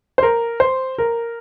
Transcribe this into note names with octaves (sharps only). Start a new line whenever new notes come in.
C5
A#4
C5
A#4